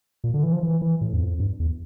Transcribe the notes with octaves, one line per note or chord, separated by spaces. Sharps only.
A#2
D3
E3
F3
E3
E3
A2
E2
F2
G2
E2